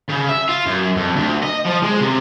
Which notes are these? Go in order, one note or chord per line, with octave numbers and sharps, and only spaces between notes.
C#3
E5
F4
F#2
F2
D2
D#5
F3
G#3
C3